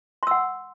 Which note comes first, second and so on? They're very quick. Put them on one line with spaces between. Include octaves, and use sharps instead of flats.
C6 E6 F#5